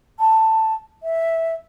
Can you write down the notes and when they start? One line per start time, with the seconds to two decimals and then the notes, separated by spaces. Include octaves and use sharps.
0.19 A5
1.03 E5